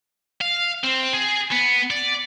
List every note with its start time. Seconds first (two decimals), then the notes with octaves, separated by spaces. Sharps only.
0.41 F5
0.84 C4
1.14 G#4
1.52 B3
1.90 D5